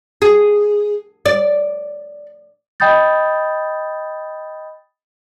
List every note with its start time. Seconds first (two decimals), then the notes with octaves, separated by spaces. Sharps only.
0.22 G#4
1.26 D5
2.80 D#5 G5 B5 D#6 G6 A6